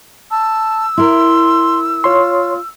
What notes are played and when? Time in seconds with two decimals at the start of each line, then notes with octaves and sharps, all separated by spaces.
0.31 A5 E6
0.97 E4 A#4 C6
2.04 F4 C#5 C6